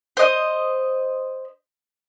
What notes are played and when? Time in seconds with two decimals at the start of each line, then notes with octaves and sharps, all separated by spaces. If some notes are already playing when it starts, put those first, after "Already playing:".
0.17 C5 D#5